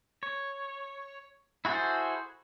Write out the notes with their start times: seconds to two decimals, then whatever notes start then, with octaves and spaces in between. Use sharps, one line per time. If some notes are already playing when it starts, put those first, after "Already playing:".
0.23 C#5
1.65 E4 F#4 G#4 A4 C5